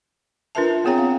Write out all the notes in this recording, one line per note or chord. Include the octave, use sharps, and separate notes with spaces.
D4 F4 A#4 B4 E5 A5
B3 C4 G#4 C#5 G5 A#5
F5